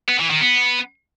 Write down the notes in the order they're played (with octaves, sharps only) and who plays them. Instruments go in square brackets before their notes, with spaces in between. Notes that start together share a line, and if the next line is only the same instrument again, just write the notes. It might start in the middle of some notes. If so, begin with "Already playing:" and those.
[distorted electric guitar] B3
E3
D#3
B3